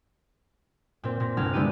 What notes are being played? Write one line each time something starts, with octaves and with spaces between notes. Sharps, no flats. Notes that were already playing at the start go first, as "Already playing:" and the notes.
A#2 C4
A#2 A#6
G1 C2 A5 F6 G#6
D3 G#3 B3 E4 G4 D#7